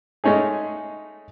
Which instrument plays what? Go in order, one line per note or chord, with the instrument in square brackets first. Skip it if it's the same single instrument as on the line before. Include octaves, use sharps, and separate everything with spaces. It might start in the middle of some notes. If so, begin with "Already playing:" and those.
[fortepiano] G#3 A3 C#4 D#4 G#4